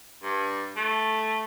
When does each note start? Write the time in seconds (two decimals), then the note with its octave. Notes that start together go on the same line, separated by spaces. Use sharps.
0.23 G2
0.77 A3